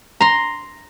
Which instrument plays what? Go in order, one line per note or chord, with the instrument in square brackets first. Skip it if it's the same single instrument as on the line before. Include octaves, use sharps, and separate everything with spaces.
[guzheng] A#5 C6